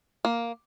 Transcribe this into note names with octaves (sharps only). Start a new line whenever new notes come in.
A#3